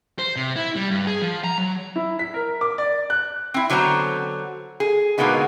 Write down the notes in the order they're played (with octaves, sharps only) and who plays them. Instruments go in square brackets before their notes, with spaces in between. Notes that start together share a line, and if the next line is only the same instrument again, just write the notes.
[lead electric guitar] C5
C3
E4
G3
G2
G#4
F3
A#5
F#3
[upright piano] E4
B6
A#4
D6
D5
F#6
[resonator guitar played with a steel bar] C4 E4
D3 F#3 B3 C5 A#5
G#4
B2 D3 G#3 A#3 B3 D#4